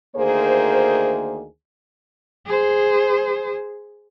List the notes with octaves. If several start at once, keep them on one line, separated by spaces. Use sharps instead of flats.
D2 D#3 A#3 G#4 C5
G#4 C5